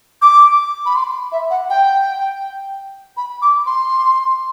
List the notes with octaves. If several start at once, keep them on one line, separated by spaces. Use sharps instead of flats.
D6
B5
C6
E5
F#5
G5
B5
D6
C6